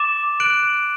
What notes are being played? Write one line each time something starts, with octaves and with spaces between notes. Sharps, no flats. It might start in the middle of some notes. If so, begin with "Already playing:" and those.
Already playing: D6 A6 E7
F#6 D7 F#7